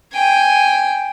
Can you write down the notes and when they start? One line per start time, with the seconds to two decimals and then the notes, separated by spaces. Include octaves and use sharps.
0.13 G5 G#5